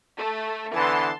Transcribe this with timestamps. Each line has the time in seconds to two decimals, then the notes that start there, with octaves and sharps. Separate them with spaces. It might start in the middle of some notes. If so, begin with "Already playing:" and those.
0.18 A3
0.74 D3 E3 B3 A5 C6